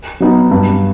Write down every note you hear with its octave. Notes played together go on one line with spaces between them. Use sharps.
F#3 B3 D#4
G2